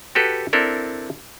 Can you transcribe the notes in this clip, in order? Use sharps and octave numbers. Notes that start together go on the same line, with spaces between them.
F#4 G4 A4 B4
C4 D4 E4 A4 A#4 D5